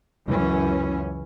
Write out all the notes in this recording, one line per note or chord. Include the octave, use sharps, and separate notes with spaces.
C#2 F#2 E3 C#4